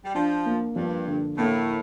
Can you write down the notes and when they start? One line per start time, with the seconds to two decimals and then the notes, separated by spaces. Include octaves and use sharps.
0.05 G3
0.14 F3 D4
0.46 A#3
0.76 G2 F3
1.07 D3
1.38 A2 A#3